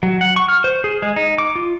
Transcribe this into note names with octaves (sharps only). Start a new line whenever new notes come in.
F#3
F#5
C#6
F6
C5
G#4
G#3
D#4
D6
F4